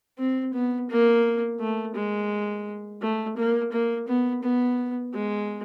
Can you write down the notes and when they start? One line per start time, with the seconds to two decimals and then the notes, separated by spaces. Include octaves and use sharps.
0.19 C4
0.54 B3
0.90 A#3
1.60 A3
1.96 G#3
3.02 A3
3.37 A#3
3.73 A#3
4.08 B3
4.43 B3
5.14 G#3